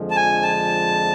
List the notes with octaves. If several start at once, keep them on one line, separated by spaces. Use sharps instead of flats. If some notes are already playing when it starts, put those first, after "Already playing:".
Already playing: F2 D3 F3 G#3
A5
G#5
A5